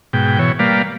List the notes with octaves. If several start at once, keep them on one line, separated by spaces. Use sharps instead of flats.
G#2 B2 G5
B2 E3 C#5
G3 A#3 B4 D5 F5